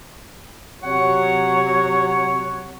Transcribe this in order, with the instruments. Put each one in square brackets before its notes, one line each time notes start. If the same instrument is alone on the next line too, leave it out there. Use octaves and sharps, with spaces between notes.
[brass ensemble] C3 F#3 C#5 [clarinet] F#5